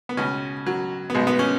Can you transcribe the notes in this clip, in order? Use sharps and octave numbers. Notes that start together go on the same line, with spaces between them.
B3
C#2 B2 C#4
F#3
B3
B1 B2 G#3
B3
C#4